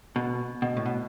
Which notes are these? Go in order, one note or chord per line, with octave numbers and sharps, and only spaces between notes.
B2
B2
A2
B2